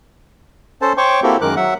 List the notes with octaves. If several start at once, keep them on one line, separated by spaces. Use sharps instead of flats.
C#4 A4 C5 A5
C5 C#5 G5 C#6 D6
A#3 C4 E4 F#4 G4 A4
F#2 D#3 G#3 A#4 D6 F#6
F#3 E5 F#5